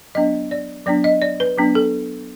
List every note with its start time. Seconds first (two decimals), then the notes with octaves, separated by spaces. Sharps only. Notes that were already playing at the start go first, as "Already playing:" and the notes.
0.15 F#3 B3 D4 D#5
0.51 D5
0.86 F#3 B3 D4 D5
1.04 D#5
1.22 D5
1.40 B4
1.57 F#3 B3 D4
1.75 A4